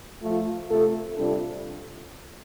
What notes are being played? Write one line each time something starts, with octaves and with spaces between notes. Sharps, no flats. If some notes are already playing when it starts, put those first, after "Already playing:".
F3 A3 F4
C3 A3 F4 A4
C3 G3 D4 F4 A4